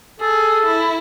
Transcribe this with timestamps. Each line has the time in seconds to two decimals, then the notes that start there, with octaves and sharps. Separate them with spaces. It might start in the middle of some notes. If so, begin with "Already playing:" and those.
0.20 G#4 A4
0.66 E4